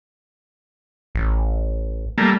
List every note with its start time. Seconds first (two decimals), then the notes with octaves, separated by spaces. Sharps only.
1.15 A1
2.18 G3 A3 A#3